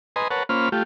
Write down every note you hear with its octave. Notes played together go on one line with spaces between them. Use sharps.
B4 D#5 G#5 A#5 C6
A#4 B4 C#5 F#5 A5
A#3 C#4 F4 C5 B5 F6
A3 F4 G4